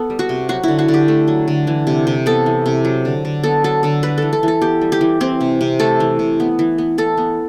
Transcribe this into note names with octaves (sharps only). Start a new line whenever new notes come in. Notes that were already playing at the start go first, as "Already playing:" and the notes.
Already playing: B3 A4
G3
F#4
C3
F#3 F#4
D3 E4
F#4
D3
G4
A3
F#3
D3
E3
C3
C3
B3 A4
E3
C3
F#3
D3
D3
B3 A4
F#3 A4
D3 A4
G3 B4
E3 A4
A4
E3 A4
B3 G4
G3
G4
E3
E3 C4
C3
C3
A3 A4
E3
C3
B3
E3
B3
E3 A4
B3